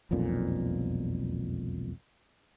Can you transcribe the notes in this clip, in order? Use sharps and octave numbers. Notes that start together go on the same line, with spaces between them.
E1 B1 F2 A#2